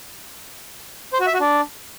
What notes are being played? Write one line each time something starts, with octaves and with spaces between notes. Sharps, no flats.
C5
F#4
E5
F#4
D4